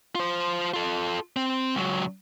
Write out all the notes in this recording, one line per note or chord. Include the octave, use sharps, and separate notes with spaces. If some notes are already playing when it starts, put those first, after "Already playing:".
F4 C5
F4 A4
C4
C#2 F#3